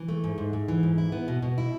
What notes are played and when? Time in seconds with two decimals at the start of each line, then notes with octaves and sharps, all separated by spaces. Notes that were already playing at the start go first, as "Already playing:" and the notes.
Already playing: E3
0.08 A3
0.24 G#2
0.38 G#2
0.53 G#2
0.68 E3
0.83 G#2
0.98 E4
1.12 B3
1.28 B2
1.42 B2
1.58 E4